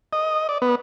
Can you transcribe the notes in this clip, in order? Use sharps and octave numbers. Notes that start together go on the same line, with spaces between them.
D#5
D5
B3